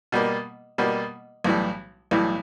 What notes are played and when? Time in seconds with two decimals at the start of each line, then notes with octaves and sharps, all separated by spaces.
0.12 B2 G3 A#3
0.78 B2 G3 A#3
1.44 B1 A2 E3 G3
2.11 B1 A2 E3 G3